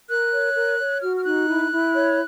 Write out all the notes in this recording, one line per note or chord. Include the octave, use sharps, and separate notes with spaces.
A#4 F#6
C#5
A#4
C#5
F#4 F6
F6
D#4 F#6
E4
E4
C#5